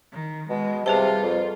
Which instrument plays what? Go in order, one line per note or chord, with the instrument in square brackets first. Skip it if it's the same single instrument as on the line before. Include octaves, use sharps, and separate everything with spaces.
[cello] D#3
[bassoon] B2 [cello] G#3
[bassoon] C3 [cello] G3 F4 [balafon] G#4 B4 A5
[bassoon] F2